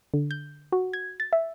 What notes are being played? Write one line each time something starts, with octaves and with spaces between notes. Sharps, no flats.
D3
G6
F#4
G#6
A6
E5